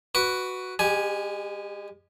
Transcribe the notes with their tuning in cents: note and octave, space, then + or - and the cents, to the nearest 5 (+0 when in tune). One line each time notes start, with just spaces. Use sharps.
F#4 +0 B4 +0 D6 -35
G#3 -35 G4 +0 G#5 +0